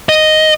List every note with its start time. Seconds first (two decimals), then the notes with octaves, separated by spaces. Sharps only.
0.09 D#5